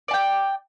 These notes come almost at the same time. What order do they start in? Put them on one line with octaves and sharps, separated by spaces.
D5 A5 G5